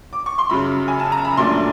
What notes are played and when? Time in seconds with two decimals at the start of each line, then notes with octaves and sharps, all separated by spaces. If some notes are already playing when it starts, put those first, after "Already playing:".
0.13 D6
0.26 C#6
0.38 C6
0.50 F#2 C#3 F#3 B5
0.88 G#5
1.00 A5
1.12 A#5
1.25 B5
1.37 A#1 A#2 F#3 A3 D4 C6